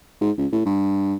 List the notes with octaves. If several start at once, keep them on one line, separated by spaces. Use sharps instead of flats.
G#2
C#2
A2
G2